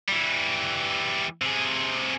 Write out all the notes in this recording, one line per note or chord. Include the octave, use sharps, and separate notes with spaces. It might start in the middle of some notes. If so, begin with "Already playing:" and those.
E3 G3
C3 G#4